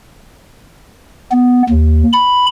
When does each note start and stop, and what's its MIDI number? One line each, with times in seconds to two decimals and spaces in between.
1.32 1.63 59
1.70 2.03 39
2.13 2.46 83